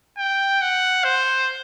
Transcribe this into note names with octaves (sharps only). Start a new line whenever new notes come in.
G5
F#5
C5